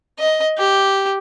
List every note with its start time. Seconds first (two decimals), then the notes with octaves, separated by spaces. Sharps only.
0.19 D#5
0.58 G4